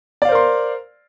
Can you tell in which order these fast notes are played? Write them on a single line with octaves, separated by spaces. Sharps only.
D5 F5 C5 A#4 C6